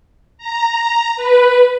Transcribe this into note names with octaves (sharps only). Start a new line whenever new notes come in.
A#5
B4